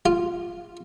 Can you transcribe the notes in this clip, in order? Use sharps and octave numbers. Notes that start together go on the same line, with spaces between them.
F4